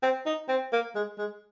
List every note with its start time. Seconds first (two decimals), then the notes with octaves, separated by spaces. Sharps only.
0.03 C4
0.26 D#4
0.49 C4
0.72 A#3
0.95 G#3
1.18 G#3